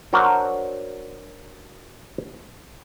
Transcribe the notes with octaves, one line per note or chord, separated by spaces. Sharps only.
F#3 D4 F#4 A#4 C5 D5